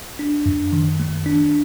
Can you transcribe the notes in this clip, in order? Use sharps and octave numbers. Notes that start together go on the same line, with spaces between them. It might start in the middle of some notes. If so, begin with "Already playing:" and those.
D4
F#2
D#3
A3
D4